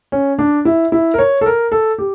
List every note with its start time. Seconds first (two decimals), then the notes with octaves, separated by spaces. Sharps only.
0.12 C#4
0.39 D4
0.65 E4
0.92 E4
1.14 A#4
1.18 C#5
1.41 A4
1.46 A#4
1.72 A4
1.98 G4